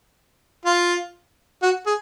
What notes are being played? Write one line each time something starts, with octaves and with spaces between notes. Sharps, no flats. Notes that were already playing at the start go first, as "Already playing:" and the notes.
F4
F#4
G#4